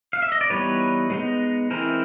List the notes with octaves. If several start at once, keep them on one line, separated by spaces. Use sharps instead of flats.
F5
E5
D#5
D5
E3 G3 B3 D#4 B4 C#5
G#3 B3 D#4
E3 G#3 C4 E4 A#4 C5